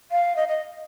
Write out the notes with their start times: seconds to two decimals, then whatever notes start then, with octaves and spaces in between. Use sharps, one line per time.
0.11 F5
0.36 D#5
0.48 D#5